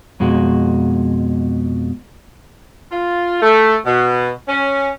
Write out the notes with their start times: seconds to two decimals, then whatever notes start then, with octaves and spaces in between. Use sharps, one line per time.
0.20 F2 B2 G#3 F#4
2.92 F4
3.42 A3
3.86 B2
4.49 C#4